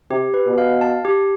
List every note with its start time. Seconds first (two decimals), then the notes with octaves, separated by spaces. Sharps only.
0.10 C3 G4
0.34 B4
0.46 B2
0.58 F5
0.81 A5
1.05 G4